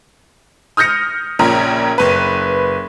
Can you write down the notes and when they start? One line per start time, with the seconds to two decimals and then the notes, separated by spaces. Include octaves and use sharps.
0.77 D#6 F6 G6 A#6 C#7
1.39 A#1 A#2 C#3 C#4 A#5
1.98 F#1 B4